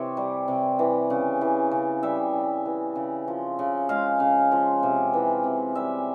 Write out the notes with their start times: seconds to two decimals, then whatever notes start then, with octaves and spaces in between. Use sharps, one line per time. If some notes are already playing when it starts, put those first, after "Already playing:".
Already playing: C3 E3 C#5
0.17 G3
0.48 C3
0.79 E3
1.10 C#3
1.41 E3
1.71 C#3
2.03 G3 E5
2.33 C#3
2.66 E3
2.96 C#3
3.28 F3
3.59 C#3
3.89 G#3 F5
4.20 C#3
4.52 F3
4.83 C3
5.13 E3
5.44 C3
5.75 G3 E5